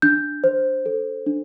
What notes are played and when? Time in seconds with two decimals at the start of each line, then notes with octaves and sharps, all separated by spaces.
0.02 D4 G6
0.44 C5
0.86 A4
1.26 D4